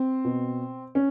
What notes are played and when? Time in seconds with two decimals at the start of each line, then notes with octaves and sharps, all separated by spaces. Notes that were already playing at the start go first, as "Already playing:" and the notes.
Already playing: C4
0.25 B2
0.95 C#4